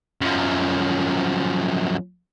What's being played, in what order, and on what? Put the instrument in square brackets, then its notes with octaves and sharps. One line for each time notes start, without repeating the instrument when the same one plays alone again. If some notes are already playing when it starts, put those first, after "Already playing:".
[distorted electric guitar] F#2 F3